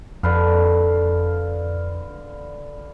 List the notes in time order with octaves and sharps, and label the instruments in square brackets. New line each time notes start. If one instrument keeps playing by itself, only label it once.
[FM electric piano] F2 [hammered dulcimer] D3 B4 F5